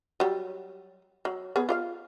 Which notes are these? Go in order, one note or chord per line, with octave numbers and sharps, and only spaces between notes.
F#3 G3
F#3
B3 G#4
F4 D5 F5